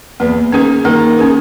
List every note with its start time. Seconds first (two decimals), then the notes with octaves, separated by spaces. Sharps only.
0.20 E2 A#3
0.52 D#3 C#4 G#4 B4
0.85 D#3 A#3
1.18 C#4 G#4 B4